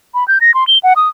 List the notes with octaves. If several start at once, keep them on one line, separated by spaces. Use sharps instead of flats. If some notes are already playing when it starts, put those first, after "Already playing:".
B5
G6
A#6
C6
G7
F#5
D#6